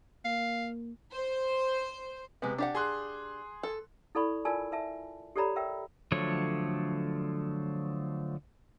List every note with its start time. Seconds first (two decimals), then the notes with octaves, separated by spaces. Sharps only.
0.25 A#3 F5
1.12 C5
2.42 C3 G#3 B3
2.58 D4 G4 F#5
2.75 G#4 C6 F#6
3.63 A4
4.15 E4 A4 D5 B5 C#6
4.45 F4 A#4 B4 D5 G#5 A5
4.72 B4 E5 A5
5.36 G4 A4 C#5 D5 A#5 B5
5.56 A#4 B4 E5 G5
6.12 D3 F3 F#3 A3 C#5